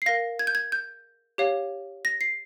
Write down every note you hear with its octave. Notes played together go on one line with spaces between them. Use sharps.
C7
A#4 F5 A#6
G#6
G6
G#6
G6
G4 C#5 F5
A#6
C7